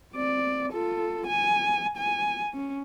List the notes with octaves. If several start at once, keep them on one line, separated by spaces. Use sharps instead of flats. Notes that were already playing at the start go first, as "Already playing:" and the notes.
C4 D5
F4 A4
G#5
G#5
C#4